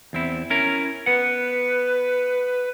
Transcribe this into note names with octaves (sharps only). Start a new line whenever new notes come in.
E2 C4 E4
C#4 E4 A#4
B3 B4 F#5